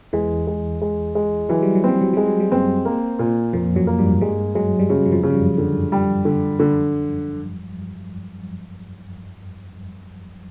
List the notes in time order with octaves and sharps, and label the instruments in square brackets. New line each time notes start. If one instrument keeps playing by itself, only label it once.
[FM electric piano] E2 E3 [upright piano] G#3
[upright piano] G#3
G#3
G#3
[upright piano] E3 [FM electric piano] F#3
[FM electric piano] G3
F#3
[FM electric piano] G3 [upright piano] C4
[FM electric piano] F#3
[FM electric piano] G3 [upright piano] G#3
[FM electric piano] F#3
G3
[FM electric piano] F#2 F#3 [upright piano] C4
[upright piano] A#3
A#2
[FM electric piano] F2 F3 [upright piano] A#2
[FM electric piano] F#2 F#3
[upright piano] A#3
[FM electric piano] G2 G3
[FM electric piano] G2 G3 [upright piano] G#3
[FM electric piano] F#2 F#3 [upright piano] G#3
[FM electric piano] G3
[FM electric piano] F#2 F#3 [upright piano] C#3
[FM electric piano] F#3
F2 F3
[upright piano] C#3
[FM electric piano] G3
F#2 F#3
[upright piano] D3
G3
D3
D3